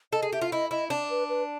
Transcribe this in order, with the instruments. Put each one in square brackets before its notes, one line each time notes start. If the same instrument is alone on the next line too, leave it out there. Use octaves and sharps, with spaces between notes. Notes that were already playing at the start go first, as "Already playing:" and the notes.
[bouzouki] A4 [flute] D#5
[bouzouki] G#4
[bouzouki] G4 [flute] E5
[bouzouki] F4
[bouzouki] E4 [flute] D#5
[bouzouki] E4 [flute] D#5
[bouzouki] D4 [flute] D5
[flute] B4
B4